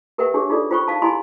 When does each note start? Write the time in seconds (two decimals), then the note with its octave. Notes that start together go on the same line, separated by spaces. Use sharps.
0.18 G4 A#4 B4 E5 F#5 G5
0.34 D4 G4 G#4 C#5 E5
0.50 D#4 F4 G#4 A4 D5
0.71 F4 C5 G5 B5 C#6
0.88 D#4 F5 A5
1.02 E4 G4 D#5 G#5 B5 C6